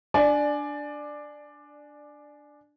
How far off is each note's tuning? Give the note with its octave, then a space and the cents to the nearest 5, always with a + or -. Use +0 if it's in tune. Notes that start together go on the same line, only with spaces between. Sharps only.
D4 +0 D5 +10 G#5 +25